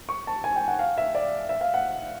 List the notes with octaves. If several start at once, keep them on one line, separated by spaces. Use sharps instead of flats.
C#6
A5
G#5
G5
F#5
F5
E5
D5
E5
F5
F#5